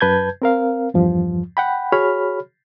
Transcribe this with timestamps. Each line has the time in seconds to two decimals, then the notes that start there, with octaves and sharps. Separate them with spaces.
0.01 F#2 B4 A5 G6 G#6
0.42 C4 A#4 F5
0.94 E2 G2 F3
1.57 F#5 G5 B5
1.92 F#4 G#4 C#5 B5 F6